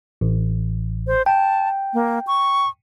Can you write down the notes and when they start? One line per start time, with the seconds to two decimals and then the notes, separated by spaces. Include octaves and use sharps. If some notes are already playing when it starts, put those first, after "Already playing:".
0.21 A1
1.07 C5
1.26 G5 A5
1.94 A#3
2.27 C#6